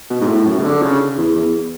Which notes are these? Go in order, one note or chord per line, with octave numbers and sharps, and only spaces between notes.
B2
G#2
A2
F#2
C#3
D3
C#3
E2
E2